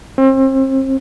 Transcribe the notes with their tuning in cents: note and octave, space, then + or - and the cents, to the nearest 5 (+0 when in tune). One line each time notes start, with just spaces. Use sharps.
C4 +35